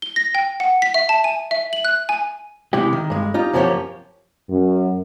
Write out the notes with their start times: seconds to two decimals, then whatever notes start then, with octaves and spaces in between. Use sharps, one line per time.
0.02 G7
0.16 A#6
0.35 G5
0.60 F#5
0.82 B6
0.94 E5
1.09 A5
1.24 G#5
1.51 E5
1.73 F#7
1.85 F#6
2.09 G#5
2.73 C3 G#3 E4 G4
2.93 D#3
3.10 G2 G#3
3.34 D#4 F4 G4
3.53 F#2 F3 A#3 C#4 G4 C#5
4.50 F#2